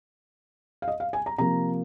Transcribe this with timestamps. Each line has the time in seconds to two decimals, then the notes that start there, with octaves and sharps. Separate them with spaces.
0.82 F5
0.88 D#5
1.00 F5
1.13 G#5
1.26 A#5
1.38 C3 F3 A#3 A#5